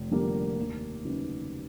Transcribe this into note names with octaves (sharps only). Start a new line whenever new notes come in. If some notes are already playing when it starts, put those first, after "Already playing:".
Already playing: F1
F2 D3 G3 A#3
D#2
C#3 F#3 B3 D#4